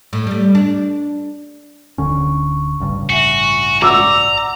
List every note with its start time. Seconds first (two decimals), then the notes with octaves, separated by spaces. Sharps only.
0.13 A2
0.27 G3 A3
0.55 D4
1.98 D1 D3 C#4 C#6
2.80 A1 G2 C#3
3.10 F#4 E5 G#5
3.82 D5 F#5 A#5 D6 E6